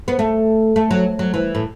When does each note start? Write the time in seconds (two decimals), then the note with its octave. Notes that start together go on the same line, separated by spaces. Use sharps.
0.08 B3
0.19 A3
0.76 A3
0.91 F#3
1.19 F#3
1.34 E3
1.55 A2